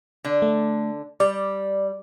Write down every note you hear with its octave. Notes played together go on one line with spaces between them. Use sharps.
D3 D4
A3
G3 D5